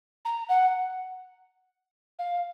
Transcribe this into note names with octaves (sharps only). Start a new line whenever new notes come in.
A#5
F#5
F5